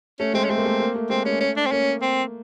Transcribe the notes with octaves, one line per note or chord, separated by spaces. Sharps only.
A3 C#4
G#3 C4
C#4
A3 C4
A#3
A3
A#3
A3
G#3 C4
A3 C#4
C#4
D4
C4
A#3 C#4
C4